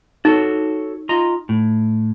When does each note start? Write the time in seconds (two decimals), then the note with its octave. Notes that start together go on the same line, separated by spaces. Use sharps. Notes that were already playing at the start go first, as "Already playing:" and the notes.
0.25 D#4 F#4 A4 C#5
1.09 F4 D#5 A#5
1.49 A2